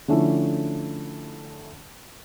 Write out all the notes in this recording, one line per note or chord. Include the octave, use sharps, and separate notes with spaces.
D3 F3 A3 C#4 D4 E4